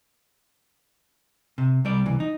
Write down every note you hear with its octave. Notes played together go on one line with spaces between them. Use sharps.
C3
C2 G3 D5
C2 E3
D#4